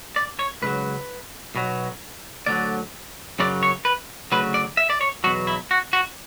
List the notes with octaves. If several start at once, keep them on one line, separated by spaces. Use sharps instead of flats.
D5
C#5
C#2 C#3 F#3 B4
B1 B2 F#3
D2 D3 F#3 D5
F#2 C#3 F#3 D5
C#5
B4
D2 C#3 F#3 B4
D5
E5
D5
C#5
E2 B2 F#3 F#4
E4
F#4
F#4